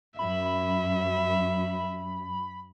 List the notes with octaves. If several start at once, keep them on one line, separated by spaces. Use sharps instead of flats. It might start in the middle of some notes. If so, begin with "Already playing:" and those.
F#2 E5 B5